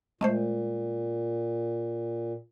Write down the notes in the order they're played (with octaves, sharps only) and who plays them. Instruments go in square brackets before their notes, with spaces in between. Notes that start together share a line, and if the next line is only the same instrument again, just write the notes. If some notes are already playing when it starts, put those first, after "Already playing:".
[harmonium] A#2 [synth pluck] G#3 A3 C5